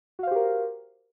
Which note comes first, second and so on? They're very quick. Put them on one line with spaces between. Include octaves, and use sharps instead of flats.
F#4 F5 C5 G4 A#4